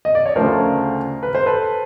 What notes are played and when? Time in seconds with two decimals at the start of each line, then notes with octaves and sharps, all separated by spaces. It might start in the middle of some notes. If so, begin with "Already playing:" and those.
0.05 D#5
0.15 D5
0.26 C#5
0.36 D2 C#3 F3 A3 A#4 C5
1.23 B4
1.35 C5
1.46 A4 B4